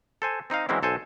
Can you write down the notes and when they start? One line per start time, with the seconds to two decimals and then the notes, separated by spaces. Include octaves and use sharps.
0.22 A4 C5 G#5
0.50 C4 D#4 D#5 F5
0.69 E3 F#3 G#3 C4 C#4 E4
0.83 B1 A4 C5 G#5